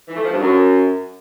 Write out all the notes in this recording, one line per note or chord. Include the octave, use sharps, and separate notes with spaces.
E3
A3
F3
G2
F#2